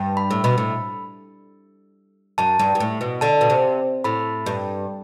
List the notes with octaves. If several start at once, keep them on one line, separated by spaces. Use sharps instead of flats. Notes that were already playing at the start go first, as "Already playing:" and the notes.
Already playing: G2
B5
A2
B2 B5
A2
F#2 A5
G2
G2
A2
B2
D3 A5
B2
C3
A2 B5
G2